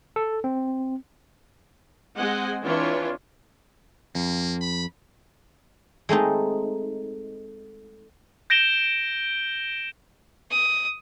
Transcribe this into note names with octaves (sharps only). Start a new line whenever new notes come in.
A4
C4
G#3 C4 D#5 F#5 G#5
E3 C4 D4 F4 C#5
F2 A#3
B5
G#3 A3 C4 D#4
G6 A#6 D7 E7 G7
D#6